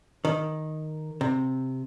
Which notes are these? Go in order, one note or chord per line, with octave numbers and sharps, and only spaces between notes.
D#3
C3